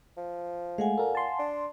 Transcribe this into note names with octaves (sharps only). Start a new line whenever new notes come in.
F3
G#3 A3 F5 F#5 G#5
A#2 A4 A#4
A5 C6
D4